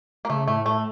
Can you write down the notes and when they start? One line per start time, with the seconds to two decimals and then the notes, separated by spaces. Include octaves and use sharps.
0.25 A#3
0.30 C#3 A3
0.48 A2 A3
0.66 A2 A3